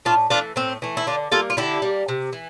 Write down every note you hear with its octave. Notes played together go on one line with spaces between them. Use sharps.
A2 D4 F4
E3 A3 D4 F4
A2 C4
E3 A3
E4
D3 D4 F4
G3 A#3 F4 A4
F4
D3 E4 G4
G3 A#3
C3
E3